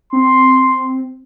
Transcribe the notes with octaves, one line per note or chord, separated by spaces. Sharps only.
C4 C6